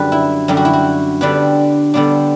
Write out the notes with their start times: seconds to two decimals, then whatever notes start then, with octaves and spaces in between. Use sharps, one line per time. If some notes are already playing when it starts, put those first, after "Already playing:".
Already playing: F#2 D3 G3 B4
0.12 E4
0.48 F#2 D3 G3 G4
0.57 F#4
0.65 E4
0.73 F#4
1.21 D3 G3 B3 D4 B4
1.94 D3 G3 B3 D4